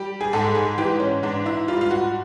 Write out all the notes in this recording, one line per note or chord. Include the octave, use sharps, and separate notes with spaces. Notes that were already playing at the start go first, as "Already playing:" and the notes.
Already playing: G3 G4
G#4
G#2 A4
G#4
E3 G4
C#4
G#2 D4
E4
G3 F4
F4
F#4